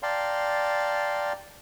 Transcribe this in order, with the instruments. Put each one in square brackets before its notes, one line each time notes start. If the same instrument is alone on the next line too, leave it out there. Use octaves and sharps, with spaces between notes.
[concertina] D5 F5 G5 A5 A#5 C6